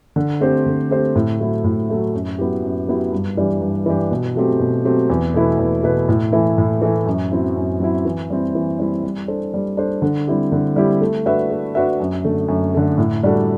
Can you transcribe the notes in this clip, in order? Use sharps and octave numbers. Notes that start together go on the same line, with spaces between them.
D3
A3 C4 G4 C5
D3
A3 C4 G4 C5
A2
F#3 A3 E4
A2
F#3 A3 E4
F#2
F#3 B3 E4 G4
F#2
F#3 B3 E4 G4
G2
E3 G3 D4 G4
G2
E3 G3 D4 G4
B2
F#3 A3 C4 G4
B2
F#3 A3 C4 G4
E2
B2 A3 E4 B4
E2
B2 A3 E4 B4
A2
E3 A3 E4
A2
E3 A3 E4
F#2
F#3 C4 E4
F#2
F#3 C4 E4
E3
G3 C4 E4
E3
G3 C4 E4
G3
D4 A4 C5
G3
D4 A4 C5
D3
G3 C4 E4 G4
D3
G3 C4 E4 G4
A3
D4 F#4 B4 E5
A3
D4 F#4 B4 E5
F#2
D3 A3
F#2
D3 A3
A2
G3 D4 F#4 A4